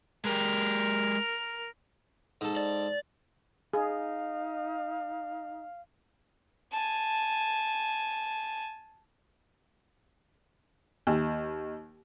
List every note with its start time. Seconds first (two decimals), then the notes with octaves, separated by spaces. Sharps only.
0.25 G#3 G4 A#4
2.41 G#2 A4
2.56 D5
3.74 D#4 G#4 F5
6.72 G#5 A5
11.07 D#2